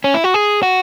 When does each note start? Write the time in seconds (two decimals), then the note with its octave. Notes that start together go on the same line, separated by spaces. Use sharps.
0.04 C#4
0.14 E4
0.24 F#4
0.34 G#4
0.63 F#4